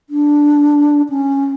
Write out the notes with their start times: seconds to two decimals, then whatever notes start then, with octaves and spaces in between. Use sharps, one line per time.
0.10 D4
1.10 C#4